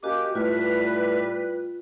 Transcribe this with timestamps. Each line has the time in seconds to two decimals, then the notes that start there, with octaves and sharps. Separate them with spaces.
0.03 A#3 C#4 F#4 G4 D#5 D6
0.35 A2 G3 F4 B4